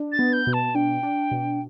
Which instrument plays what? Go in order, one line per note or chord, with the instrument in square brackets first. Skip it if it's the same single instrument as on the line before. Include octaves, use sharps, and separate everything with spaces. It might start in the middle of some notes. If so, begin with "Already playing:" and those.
Already playing: [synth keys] D4
[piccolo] A6
[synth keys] B3
[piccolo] G6
[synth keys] B2
[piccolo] A5
[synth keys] D4 [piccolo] G5
[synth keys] D4
B2